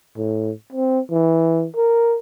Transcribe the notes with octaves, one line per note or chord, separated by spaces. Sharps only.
A2
C4
E3
A#4